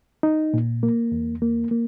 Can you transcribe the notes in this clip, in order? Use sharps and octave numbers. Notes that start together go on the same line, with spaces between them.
D#4
A#2
A#3
E2
A#3
A#3